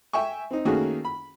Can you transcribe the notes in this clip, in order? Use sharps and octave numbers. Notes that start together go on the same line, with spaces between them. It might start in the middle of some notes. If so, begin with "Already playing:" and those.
E5 G5 G#5 C#6
C4 D#4
D#3 A3 A#3 C#4 F#4 G#4
B5